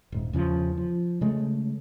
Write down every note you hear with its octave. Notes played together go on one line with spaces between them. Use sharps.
D#1 G#2
E2 C#3 E3 F3
F3
C#3 G#3 A3